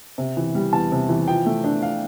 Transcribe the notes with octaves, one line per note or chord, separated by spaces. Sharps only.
C3
E3
G3
E2 A5
C3
E3
F3 G5
A3
D4
F5